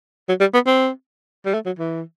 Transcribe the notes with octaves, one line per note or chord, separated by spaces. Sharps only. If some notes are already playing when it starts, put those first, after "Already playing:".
F#3
G3
B3
C4
G3
A3
F#3
E3